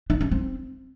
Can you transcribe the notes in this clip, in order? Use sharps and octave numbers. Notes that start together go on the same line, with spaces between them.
D4
C#4
C4